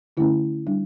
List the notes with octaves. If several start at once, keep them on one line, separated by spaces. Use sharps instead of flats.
D3 A3 C#4 E4
G3 D4